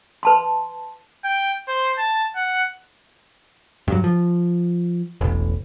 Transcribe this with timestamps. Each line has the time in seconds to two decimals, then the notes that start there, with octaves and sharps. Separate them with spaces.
0.23 B4 A5 C6
1.24 G5
1.68 C5
1.98 A5
2.36 F#5
3.88 G2 F#3
4.04 F3
5.21 E1 A1